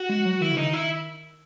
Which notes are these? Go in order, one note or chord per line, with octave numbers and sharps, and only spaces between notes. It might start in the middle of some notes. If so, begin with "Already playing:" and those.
Already playing: F#4
G#3
F#3
D#3 E4
C#3
D#4
D#3
E4